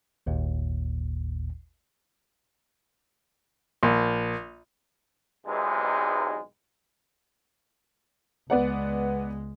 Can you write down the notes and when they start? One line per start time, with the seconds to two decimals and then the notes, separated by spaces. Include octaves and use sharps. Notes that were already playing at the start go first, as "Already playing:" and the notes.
0.26 G#1 D#2 A#2
3.83 A#1
5.46 B1 E2 G#2 C3 G#3
8.50 C#2 G#3 B3 D5 F#5